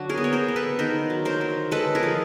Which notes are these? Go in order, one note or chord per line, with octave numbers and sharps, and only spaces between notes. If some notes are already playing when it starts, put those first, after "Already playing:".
Already playing: D3 F#3 D4 F#4
G#4 A#4
B3
C#5
A#4 C5
B3
A4 B4
D#3 A#4 C5
F#3
A#4 C5
F#3
G#3 A4 B4
G#4 A#4
F3